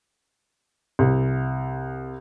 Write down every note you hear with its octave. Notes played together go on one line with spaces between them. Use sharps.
C2